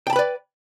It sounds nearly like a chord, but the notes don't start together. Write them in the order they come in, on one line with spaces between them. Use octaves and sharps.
G5 A5 B5 B4 D5